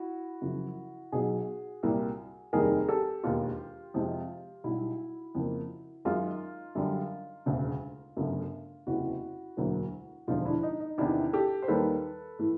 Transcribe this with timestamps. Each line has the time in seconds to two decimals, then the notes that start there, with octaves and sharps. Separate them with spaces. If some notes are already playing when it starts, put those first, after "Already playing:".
Already playing: E4 F#4
0.41 F#2 C#3 F3
1.12 B1 B2 F#3 F#4 G#4
1.83 C2 A#2 G3 A#3
2.53 F1 D#2 D#3 G3 G#4 A#4
2.89 G4 A4
3.24 E1 D#2 D#3 F4 G4
3.94 F2 C3 F3 G#3
4.64 B1 B2 G3 E4 F#4
5.35 F2 C#3 F3 A#3
6.05 F#2 D#3 G#3 D#4 F4
6.75 F#2 D3 G3
7.46 E1 D2 C#3
8.17 G1 F#2 C#3 F#3 A3
8.87 F#1 E2 C3 E4 F#4
9.57 E1 D2 D3 F#3 A#3
10.27 E1 D2 D3 F3 D#4 F4
10.45 D4 E4
10.63 D#4
10.80 D#4
10.98 E2 C3 D#3 D4 E4
11.33 G4 A4
11.62 C5
11.68 D#2 D#3 G3 A#3 A4 B4
12.39 A2 E3 A3